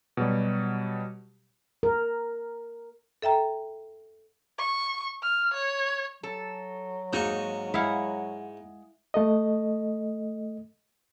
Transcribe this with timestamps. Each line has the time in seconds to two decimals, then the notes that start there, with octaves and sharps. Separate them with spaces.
0.17 B2 F#3 G3 G4
1.83 A#4
3.22 A4 E5 G5 A#5
4.58 C#6
5.22 F6
5.53 C#5
6.23 F#3 A4
7.13 G#2 A#3 D#4 F#4 G#5 C#6
7.74 G#3 E4 F5 F#5
9.14 A3 A4 D#5